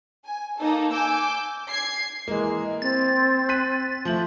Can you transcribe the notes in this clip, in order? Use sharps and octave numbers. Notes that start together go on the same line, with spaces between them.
G#5
A#3 D#4 A4
G#5 D6 E6 G6
G#6 C7
E3 G#3 A#3
C4 A6
F#6 B6 D#7
F3 A3 F#7